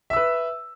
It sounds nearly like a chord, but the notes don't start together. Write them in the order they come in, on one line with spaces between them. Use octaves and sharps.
E5 E6 B4